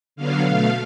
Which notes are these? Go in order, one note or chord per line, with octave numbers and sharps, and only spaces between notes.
D3 F#3 B3 F5
B2 A3 F5